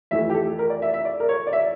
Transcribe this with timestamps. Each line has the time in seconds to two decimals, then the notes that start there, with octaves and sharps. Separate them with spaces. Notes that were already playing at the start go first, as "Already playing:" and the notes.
0.11 F2 E3 A3 E5
0.30 G4
0.34 A4
0.59 A#4
0.70 D5
0.82 E5
0.94 E5
1.05 D5
1.20 A#4
1.29 C#5
1.47 D5
1.53 E5